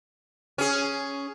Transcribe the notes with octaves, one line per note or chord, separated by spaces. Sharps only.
C#4 G#4